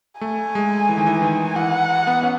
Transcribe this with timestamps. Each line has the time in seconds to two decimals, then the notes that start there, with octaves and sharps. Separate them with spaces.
0.21 A3 G#5
0.55 G#3
0.89 E3
0.98 D#3
1.07 E3
1.22 D#3
1.56 E3 F#5
2.07 B3
2.23 C#4